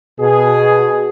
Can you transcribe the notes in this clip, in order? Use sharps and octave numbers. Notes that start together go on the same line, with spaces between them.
B2 G#4